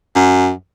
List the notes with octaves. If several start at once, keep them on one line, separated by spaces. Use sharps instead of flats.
F#2